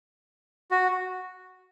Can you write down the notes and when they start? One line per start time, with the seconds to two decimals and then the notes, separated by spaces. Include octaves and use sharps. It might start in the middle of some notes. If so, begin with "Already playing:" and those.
0.71 F#4